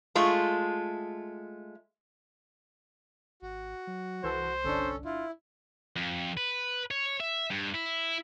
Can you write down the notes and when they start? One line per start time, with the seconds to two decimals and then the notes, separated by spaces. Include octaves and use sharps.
0.15 G#3 A3 F4
3.42 G#1 F#4
3.87 F#3
4.24 C2 E3 A4 C5
4.64 G1 C#4 D4 A4
5.05 E4 F4
5.96 F2
6.37 B4
6.91 C#5
7.20 E5
7.51 G2
7.74 E4